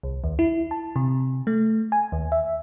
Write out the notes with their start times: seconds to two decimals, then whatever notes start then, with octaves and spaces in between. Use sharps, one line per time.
0.03 C2
0.24 D#2
0.39 E4
0.71 A5
0.96 C3
1.47 A3
1.92 G#5
2.12 D#2
2.32 E5